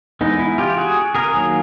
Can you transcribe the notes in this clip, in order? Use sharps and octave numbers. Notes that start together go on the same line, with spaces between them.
E3 G#3 B3 D#4
E4
F4 G4
F#4 G#4
G#4 A#4
D#3 F#3 A#3